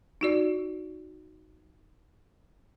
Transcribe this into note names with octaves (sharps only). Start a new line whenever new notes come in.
D#4 F#4 D5